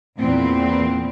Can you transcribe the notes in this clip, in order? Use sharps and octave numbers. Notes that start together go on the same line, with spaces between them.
E2 A#2 C4